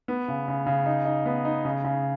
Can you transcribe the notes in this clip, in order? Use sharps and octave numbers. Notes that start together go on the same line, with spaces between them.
B3
C#3
C#3
C#3
D#4
D#4
B3
D#4
C#3
C#3